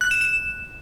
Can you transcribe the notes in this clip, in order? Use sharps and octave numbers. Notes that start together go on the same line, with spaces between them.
F#6
E7
E7